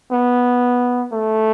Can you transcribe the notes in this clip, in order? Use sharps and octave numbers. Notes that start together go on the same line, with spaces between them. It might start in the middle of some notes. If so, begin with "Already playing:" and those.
B3
A3